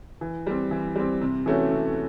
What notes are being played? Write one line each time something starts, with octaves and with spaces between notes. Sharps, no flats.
E3
G3 C4
E3
G3 C4
C3
E3 A3 C#4 F#4
C3